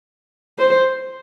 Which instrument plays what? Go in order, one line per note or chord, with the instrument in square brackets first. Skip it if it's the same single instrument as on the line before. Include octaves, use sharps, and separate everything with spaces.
[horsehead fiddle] C5